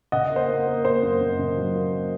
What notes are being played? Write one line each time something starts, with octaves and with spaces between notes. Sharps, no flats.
C#3 D#5 F#5
A#3
C5
A#3
A#3
A#3 C5
F#2
F#2
C#3
F#3
A#3
A#3